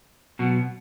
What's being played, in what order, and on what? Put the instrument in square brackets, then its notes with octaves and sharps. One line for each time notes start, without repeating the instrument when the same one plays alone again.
[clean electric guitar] B2 F#3